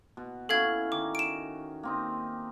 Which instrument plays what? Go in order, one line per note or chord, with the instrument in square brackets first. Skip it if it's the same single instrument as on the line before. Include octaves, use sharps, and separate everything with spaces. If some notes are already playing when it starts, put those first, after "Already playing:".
[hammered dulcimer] B2
[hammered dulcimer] C#4 E4 F#4 [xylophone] A4 F5 G#6
[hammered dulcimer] D#3 [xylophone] D6
[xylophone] D7 E7
[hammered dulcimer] A#3 C4 D#4